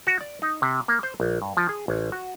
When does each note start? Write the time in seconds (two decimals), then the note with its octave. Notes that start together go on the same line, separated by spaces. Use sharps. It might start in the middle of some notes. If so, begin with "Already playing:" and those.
0.07 F#4
0.21 D5
0.42 D#4
0.62 C3
0.88 A#3
1.03 C5
1.20 A#1
1.42 G2
1.57 F3
1.69 G#4
1.88 A1
2.12 F#4